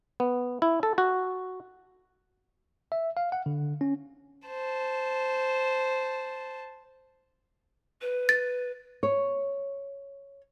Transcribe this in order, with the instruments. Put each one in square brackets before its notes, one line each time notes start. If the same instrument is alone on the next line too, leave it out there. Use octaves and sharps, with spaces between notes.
[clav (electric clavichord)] B3
E4
A4
F#4
[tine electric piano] E5
F5
F#5
D3
C#4
[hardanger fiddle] C5 A5
[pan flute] B4
[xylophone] A6
[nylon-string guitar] C#5